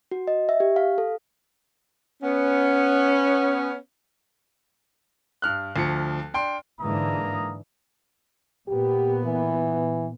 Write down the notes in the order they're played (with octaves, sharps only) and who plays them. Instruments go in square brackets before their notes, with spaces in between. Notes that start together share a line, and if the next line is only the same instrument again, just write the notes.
[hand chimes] F#4
D#5
E5
G4
F5
A4
[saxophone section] B3 C#4
[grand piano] G2 F6 F#6
D2 F3 C#7
D4 G5 C6
[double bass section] G#2 D3 [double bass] E3 D4 [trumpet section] A#3 A#5 D#6
[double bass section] A#2 B3 [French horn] G4
[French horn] E3